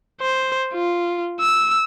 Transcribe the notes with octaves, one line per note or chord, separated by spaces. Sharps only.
C5
F4
E6